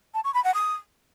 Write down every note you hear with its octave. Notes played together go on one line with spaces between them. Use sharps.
A5
C#6
B5
F#5
D#6